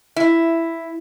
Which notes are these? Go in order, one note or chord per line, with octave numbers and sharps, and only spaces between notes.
E4